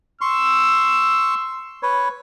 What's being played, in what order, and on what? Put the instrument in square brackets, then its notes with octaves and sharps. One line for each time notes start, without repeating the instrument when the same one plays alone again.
[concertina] C6 C#6 [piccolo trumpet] E6
[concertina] B4 C#5